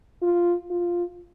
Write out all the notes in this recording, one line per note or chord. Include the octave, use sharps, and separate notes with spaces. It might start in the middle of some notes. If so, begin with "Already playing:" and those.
F4
F4